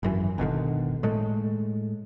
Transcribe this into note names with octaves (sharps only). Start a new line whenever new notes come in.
G#1 F#2 E3
G1 B2 D3 D#3
A2 G#3 A3